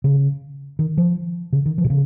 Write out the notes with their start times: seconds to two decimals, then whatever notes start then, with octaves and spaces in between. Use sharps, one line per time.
0.04 C#3
0.79 D#3
0.98 F3
1.53 C#3
1.66 D#3
1.78 F3
1.84 C3
1.90 C#3